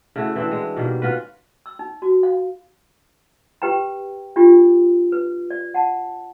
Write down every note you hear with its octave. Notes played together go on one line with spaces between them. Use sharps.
C#3 A3 E4 F#4
E3 C4 D4
G#3
B2 D#3 G3 A#3
C#4 F4 F#4 B4
E6
D#4
F#4
F5
G4 B4 G5 A#5
D4 F4 G4
B4
D5
F#5 A5